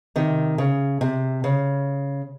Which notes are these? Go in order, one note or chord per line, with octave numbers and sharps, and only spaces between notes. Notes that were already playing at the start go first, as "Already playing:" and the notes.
C3 D#3
C#3
C3
C#3